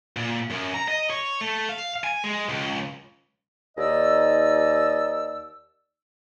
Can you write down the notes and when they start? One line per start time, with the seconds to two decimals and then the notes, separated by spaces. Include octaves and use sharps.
0.17 A#2
0.50 F#2
0.74 A#5
0.88 D#5
1.10 C#5
1.41 A3
1.69 F5
2.04 G#5
2.24 G#3
2.49 C#2
3.78 D#2 D#4 D5 D#5 E6